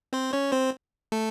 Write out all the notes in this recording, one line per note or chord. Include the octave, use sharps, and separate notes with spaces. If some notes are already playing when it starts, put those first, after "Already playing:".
C4 C5
C#4 C#5
C4 C5
A3 A4